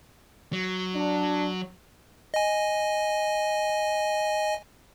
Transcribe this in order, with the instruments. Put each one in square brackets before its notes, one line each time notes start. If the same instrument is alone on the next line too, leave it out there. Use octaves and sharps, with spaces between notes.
[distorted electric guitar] F#3
[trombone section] D4
[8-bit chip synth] D#5 G#5